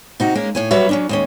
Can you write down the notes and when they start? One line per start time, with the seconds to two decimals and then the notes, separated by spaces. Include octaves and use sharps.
0.20 C3 D#4 F#4
0.35 G#3 A#3 C#4 A#4
0.55 A2 C#5 G#5
0.71 F#3 G3 F#4 B4 C#5 E5
0.89 F#3 C#4 D4
1.09 D#2 G#3 C#4